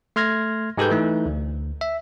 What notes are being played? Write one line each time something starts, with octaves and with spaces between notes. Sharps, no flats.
A3 C6 F6 G#6 A#6
G#2 G#3 G4 A4 B4 G6
E3 A3 D#4
D2
E5